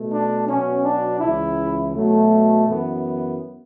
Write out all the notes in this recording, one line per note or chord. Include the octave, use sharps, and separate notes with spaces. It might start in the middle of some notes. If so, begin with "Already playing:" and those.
Already playing: B2 A3
D4
B2 F#3 B3 C#4
D4
C#2 C#3 E3 E4
B2 F#3 A3
F#2 E3 B3